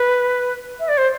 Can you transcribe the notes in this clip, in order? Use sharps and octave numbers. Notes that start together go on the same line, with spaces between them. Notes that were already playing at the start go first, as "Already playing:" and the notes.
Already playing: B4
E5
D5
C5